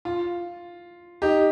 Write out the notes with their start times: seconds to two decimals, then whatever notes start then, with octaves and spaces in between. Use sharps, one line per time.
0.05 F4
1.22 D#4 G4